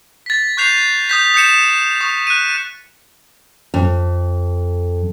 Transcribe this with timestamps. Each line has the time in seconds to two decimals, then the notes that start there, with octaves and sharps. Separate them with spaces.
0.26 A6 B6
0.57 C#6 F#6 G6 C7 F7
1.09 D#6 G6 B6
1.34 D#6 G6 C#7 E7
2.01 C#6 D#6
2.27 F#6 D#7
3.74 F2